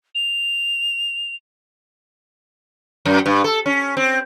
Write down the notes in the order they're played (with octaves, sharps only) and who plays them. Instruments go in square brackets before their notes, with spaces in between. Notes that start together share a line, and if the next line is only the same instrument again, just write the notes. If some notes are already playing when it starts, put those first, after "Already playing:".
[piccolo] F7
[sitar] F#2
G2
A4
C#4
C4